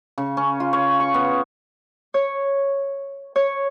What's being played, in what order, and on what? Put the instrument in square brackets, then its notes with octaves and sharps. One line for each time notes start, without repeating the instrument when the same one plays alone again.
[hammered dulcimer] C#3
C#4
F4
C#5
C#6
B3
[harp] C#5
C#5